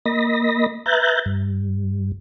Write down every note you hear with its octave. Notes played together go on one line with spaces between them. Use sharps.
A#3 D#5 B5 A#6
B4 E5 A#5 F#6 G6 A6
G2